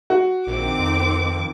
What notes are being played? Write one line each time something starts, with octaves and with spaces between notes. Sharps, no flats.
F#4
A#1 D#3 C4 D6
F2